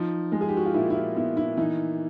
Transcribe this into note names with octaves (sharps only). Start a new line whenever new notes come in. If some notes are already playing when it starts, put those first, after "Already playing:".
Already playing: F3 D#4
G#3
G#4
G4
F#4
F4
A#2 E4
E4
F4
B3 E4
E4
E3 D#4